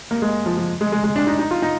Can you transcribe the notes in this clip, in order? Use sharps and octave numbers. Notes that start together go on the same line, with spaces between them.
A#3
G#3
F3
F3
G#3
G#3
G#3
D4
D#4
D#4
F4
D#4